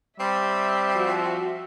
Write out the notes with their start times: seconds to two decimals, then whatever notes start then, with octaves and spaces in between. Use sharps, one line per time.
0.20 G3 C4 E5
0.95 F3 F#4